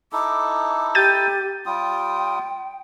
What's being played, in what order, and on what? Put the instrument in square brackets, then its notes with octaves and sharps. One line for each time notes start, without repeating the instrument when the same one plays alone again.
[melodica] D#4 E4 A4 [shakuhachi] D6
[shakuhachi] G4 [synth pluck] G6 A6 D#7
[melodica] G3 F4 D#6 [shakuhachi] G5